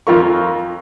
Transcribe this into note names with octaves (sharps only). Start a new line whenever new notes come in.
F2 F3 F4 A#4 C#6